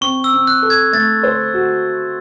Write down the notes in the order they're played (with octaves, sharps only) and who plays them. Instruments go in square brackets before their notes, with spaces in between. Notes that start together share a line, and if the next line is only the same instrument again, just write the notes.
[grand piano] C4 [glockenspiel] C#6
[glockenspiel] E6
[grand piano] C4
[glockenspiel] F#6
[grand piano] A4
[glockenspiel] G#6
[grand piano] A3 [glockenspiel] A6
[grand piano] C5
F#4